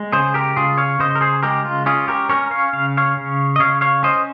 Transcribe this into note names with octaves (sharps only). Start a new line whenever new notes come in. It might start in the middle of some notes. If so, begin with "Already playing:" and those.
Already playing: G#3
C#3 G#4 C5
G4 A#4
C#3 F4 G#4
C#5 F5
C#3 C5 D#5
A#4
G#4 C5
G#3 G4 A#4
F4
C#4 F4 G#4
G4 A#4
C#4 A#4 C#5
C#5 F5
C#3 F5
C#5 F5
C#3
D#5
C#3 C#5 F5
C#5 F5
C#4 C5 D#5